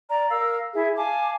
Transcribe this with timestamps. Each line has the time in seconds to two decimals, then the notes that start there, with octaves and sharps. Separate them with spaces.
0.09 D5 A#5
0.30 A#4 F5 E6
0.75 E4 G#4 E5
0.97 F5 G#5 A5 D6